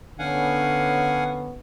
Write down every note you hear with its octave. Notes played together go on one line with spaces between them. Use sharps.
D3 B3 C#4 F5 F#5 G#5